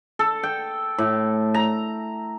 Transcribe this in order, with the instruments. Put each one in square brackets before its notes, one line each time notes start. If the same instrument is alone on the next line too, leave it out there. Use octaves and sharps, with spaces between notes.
[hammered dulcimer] A4
G5
A2
A#5